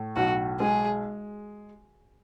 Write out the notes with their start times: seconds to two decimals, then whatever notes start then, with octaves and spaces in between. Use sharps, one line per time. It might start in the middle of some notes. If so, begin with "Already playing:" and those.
Already playing: A2
0.16 B1 F#4
0.60 G#3 G#4